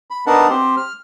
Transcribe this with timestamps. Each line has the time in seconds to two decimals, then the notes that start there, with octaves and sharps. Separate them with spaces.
0.10 B5
0.27 B3 D4 D#4 A#4 F#5 A5
0.49 C4 G4 C5
0.77 F6